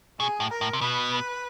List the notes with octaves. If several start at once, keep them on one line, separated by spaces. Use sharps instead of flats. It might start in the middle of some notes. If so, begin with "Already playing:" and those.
B2 G#4
A2
A#4
A2
C3
B2 B4